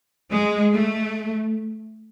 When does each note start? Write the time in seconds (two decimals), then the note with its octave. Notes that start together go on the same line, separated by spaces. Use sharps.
0.32 G#3
0.74 A3